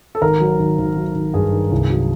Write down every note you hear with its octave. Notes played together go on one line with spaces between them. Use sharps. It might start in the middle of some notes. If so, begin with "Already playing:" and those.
A4
G#1 A#4
F#3
G#1
G#1
F#3
G#1
G2 G#4
D#3
C2
F#3